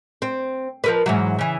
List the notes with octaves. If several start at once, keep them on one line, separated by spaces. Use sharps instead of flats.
C4
F3 A#4 B4
G#2 E3 F#3
C#3 E3